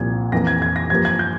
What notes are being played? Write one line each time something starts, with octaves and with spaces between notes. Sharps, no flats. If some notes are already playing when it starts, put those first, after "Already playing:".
Already playing: C2 A#2 F3 A#3 G#6
F2 E3 A#3 A#6
G#6
G#6
A#6
G2 F3 A#3 G#6
G#6
G6